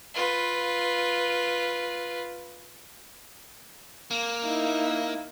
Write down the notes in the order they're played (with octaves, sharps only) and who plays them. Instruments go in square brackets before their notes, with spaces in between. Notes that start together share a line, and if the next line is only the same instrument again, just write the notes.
[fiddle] F4 B4
[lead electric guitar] A#3
[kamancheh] D#4 E4